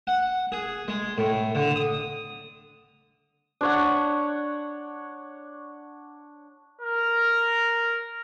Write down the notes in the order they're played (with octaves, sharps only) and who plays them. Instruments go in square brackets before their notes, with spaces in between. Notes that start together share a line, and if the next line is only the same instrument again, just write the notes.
[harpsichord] F#5
G#4
G#3
A2
D3
D#6
[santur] D4 C#5 F#5
[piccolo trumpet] A#4